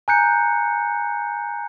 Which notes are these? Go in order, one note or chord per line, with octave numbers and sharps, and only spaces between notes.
G#5 A#5 F#6 G6 C#7